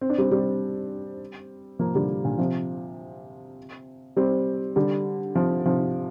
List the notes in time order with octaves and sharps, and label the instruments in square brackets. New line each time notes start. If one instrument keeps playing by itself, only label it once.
[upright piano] C4
D4
G3 C4
G3 C4
F3 A#3
D3 G3
A#2 D3
C3 F3
G3 C4
D3 G3
C3 F3
C3 F3